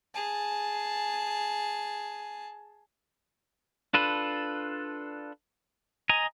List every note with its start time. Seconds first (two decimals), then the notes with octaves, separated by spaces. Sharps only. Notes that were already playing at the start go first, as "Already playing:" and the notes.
0.14 G#4 A5
3.93 D4 F4 A4 B4
6.09 D#5 G#5 A#5